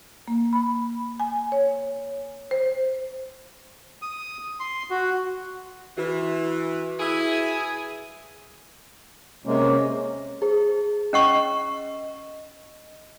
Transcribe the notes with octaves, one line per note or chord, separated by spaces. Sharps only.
A#3
B5
G#5
C#5
C5
D#6
C6
F#4
E3 F#4 B4
E4 G#4
C3 G#3 A#3 C#4
G#4 C5
C#4 D#5 F#5 C#6